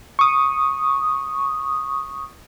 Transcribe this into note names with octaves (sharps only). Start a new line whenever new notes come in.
C#6 D#6